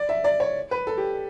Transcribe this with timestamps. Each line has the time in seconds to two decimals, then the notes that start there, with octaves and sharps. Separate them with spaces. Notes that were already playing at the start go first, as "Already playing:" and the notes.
Already playing: D5
0.09 E5
0.24 D5
0.40 C#5
0.71 B4
0.87 A4
0.97 G4